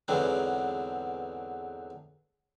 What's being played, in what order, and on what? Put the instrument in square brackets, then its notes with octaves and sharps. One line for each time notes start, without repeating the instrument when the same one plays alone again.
[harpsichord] E2 G#2 D3 F#3 B3 C4